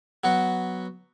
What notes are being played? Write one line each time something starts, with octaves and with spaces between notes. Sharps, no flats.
F#3 B3 F#4